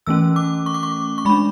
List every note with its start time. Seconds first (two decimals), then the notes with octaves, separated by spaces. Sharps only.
0.07 E3 A3 C#4 E6
0.36 D6
0.66 C#6
0.74 D6
0.83 C#6
1.18 C#6
1.25 G#3 D4 B5